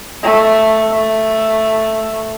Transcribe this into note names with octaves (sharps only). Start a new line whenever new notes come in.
A3
A3